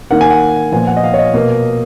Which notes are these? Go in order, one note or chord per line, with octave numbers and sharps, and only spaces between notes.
D#3 A#3 F#5
G#5
F#5
A#2 F3 B3 G#5
F#5
D#5
F5
C#5
D#5
B2 A#3